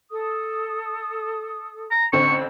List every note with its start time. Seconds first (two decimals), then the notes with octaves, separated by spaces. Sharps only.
0.10 A4 D#6
1.91 A#5
2.13 A1 D3 C4 C#6